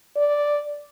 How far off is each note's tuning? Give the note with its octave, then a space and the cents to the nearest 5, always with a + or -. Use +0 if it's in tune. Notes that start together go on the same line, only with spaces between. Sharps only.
D5 -5